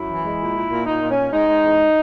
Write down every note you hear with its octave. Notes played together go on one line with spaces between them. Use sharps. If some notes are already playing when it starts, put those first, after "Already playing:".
Already playing: F#2 E4
E3
G#3
A#2
A#2
A#2
A#2 D#4
A#2
C#4
A#2
G#3 D#4
G#3
E2